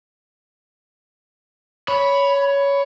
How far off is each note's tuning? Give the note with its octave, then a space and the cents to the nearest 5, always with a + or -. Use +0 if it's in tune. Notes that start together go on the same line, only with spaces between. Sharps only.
C#5 +15 B5 +0